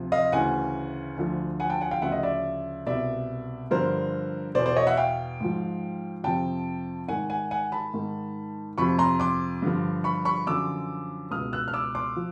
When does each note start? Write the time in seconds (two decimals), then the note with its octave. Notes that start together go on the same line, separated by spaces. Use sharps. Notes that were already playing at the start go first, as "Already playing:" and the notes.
Already playing: D2 C3 F3
0.12 D#5 F5
0.32 D2 C#3 E3 F#5 G#5
1.17 D2 D3 F3
1.60 F#5 G#5
1.70 G5 A5
1.81 F#5 G#5
1.91 F5 G5
2.02 D2 C#3 F3 E5 F#5
2.12 D#5
2.23 D5 E5
2.86 C2 B2 D5 E5
3.71 G2 D3 F3 A#4 C5
4.55 B2 C5 D5
4.59 E2
4.66 C5 D5
4.76 C#5 D#5
4.87 E5 F#5
4.97 F5 G5
5.41 G#2 F3
6.24 F2 C3 F3 G5 A5
7.08 G#2 D#3 F#5 G#5
7.30 F#5 G#5
7.51 F#5 G#5
7.72 A5 B5
7.94 G#2 D#3
8.78 F2 C3 F3 B5 C#6
8.99 A#5 C6
9.20 C6 D6
9.62 G2 D3 F3
10.04 B5 C#6
10.25 B5 C#6
10.47 F#2 D3 F3 D6 E6
11.31 C#2 B2 D#6 F6
11.53 E6 F#6
11.68 F6
11.74 D6 E6
11.95 C6 D6
12.16 F3